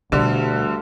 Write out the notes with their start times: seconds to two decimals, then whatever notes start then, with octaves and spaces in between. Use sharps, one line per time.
0.12 D2 G2 B2 D3